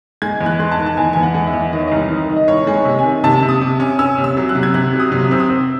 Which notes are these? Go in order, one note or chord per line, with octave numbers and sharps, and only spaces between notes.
G#3 G#6
E2
F#6
G#3 C6
A5
D#3
A5
E2 G#5
E2 G#5
F#5
G#3
E5
E2
D#3 D#5
C#5
C2 D#5
D#3
D#3
D#5
C2 C#5
G#3
C#5
C3
G#5
D#3
C3 A5
C3
D#6
C3
C#4
C#4 E6
C3
E6
F#3
F#6
C3
G#6
C3 F#6
F#3
D#6
C3
D#6
C4 E6
D#6
C4